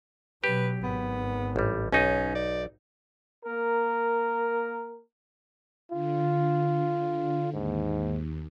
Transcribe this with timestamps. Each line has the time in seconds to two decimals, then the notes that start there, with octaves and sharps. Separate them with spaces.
0.44 B2 F#3 G4 B4
0.83 G#1 B3
1.56 A1 G3
1.92 B1 C#4 D#4 D#5
2.35 D5
3.45 A#3 A#4
5.91 D3 F4
7.54 D#2 G#2